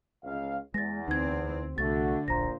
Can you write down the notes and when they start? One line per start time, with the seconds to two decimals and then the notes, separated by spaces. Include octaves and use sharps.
0.24 C#2 F5
0.74 E2 G#3 A6 A#6
1.08 D2 C4 D#4 G#6
1.78 C2 D3 A3 F#4 A6
2.28 D1 A#1 A#2 C5 A#5 A#6